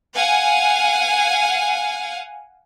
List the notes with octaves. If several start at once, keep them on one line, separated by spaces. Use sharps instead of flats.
F5 F#5 G#5